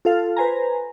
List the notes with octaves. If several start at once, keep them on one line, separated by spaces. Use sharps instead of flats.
F4 A4 F5
B4 C5 G#5 A#5